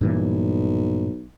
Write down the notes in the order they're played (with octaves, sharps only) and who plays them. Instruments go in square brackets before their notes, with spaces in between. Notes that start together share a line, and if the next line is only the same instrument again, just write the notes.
[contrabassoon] B1 [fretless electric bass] G2 A#2 E3